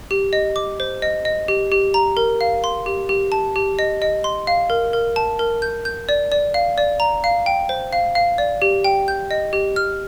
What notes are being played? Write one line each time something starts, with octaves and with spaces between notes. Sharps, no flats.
G4
D#5
D6
C5
D#5
D#5
G4
G4
A#5
A#4
F5
C6
G4
G4
A5
G4
D#5
D#5
C6
F5
A#4
A#4
A5
A#4
G6
G6
D5
D5
F5
D5
A#5
F5
G5
C5
F5
F5
D5
G4
G5
G6
D#5
G4
F6